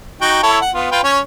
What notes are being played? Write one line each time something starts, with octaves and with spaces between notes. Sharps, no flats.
D#4 F#4 G5
E4 A4 C#5
F#5
B3 F4
F4 B4 G5
C#4 C#5